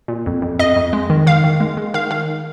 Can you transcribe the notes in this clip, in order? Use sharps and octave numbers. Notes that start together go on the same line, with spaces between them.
A#2
F2
F2
F2 D#5
F2
G#3
D#3
D#3 F5
D#3
G#3
G#3
D#3 F5
D#3 F5